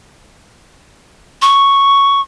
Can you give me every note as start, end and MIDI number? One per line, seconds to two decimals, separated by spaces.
1.42 2.21 85